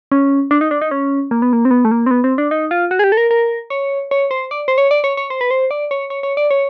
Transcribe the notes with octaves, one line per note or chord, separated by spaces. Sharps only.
C#4
D4
D#4
D4
D#4
C#4
A#3
B3
A#3
C4
B3
A3
A#3
C4
B3
C4
D4
D#4
F4
F#4
G#4
G4
A4
A#4
A#4
C#5
C#5
C5
D5
C5
C#5
D5
C#5
C#5
C5
B4
C5
D5
C#5
C#5
C#5
D5
C#5